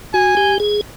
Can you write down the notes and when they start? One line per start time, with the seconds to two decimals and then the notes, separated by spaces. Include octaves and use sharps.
0.14 F#4 G#5
0.37 G4
0.60 G#4